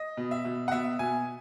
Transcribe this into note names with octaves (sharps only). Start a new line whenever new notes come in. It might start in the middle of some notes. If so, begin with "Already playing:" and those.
Already playing: D#5
B2
E5
B2
F#5
B2 E5
B2 G#5